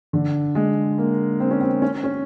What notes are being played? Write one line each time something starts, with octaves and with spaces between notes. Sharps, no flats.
D3
G#3
A#3
C4
C#4
C4
C#4
C#4